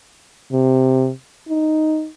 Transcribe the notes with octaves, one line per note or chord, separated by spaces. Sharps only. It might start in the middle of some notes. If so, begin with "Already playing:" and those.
C3
D#4